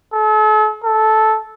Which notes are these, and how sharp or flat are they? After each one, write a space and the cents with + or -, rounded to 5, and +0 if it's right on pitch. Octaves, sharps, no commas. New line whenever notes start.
A4 -40
A4 -10